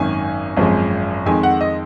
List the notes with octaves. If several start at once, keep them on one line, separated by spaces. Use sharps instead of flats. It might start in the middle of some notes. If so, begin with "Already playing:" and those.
Already playing: G#1 F#2 D#3 G#5
G#1 F#2 F3 G#3
F2 D#3 G#3 G#5
F#5
D#5